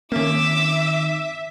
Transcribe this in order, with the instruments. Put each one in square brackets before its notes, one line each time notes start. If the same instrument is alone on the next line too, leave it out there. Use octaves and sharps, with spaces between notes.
[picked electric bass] D#3 C4 [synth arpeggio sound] A#3 C#4 [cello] E5 [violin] D6 E6